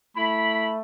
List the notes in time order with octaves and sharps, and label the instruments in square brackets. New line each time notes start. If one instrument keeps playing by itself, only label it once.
[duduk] A3 [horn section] E4 B5